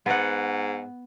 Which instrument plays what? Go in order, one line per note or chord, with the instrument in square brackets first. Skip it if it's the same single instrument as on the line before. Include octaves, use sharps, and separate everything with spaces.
[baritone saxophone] G#2 [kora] B3 F#5